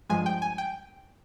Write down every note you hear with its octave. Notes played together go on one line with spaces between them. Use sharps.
G2 F3 G#3 G#5
G5
G#5
G5